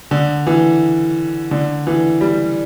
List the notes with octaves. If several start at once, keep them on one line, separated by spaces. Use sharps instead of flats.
D3
E3
D3
E3
G3